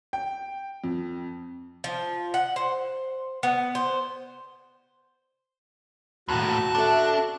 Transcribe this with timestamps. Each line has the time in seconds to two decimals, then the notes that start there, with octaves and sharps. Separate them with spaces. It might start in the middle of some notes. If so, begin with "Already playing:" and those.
0.13 G5
0.84 F2
1.84 F3
2.34 F#5
2.56 C5
3.43 B3
3.75 C5
6.29 D#2 A2 F#4 A5 F#6
6.75 D4 A4 E5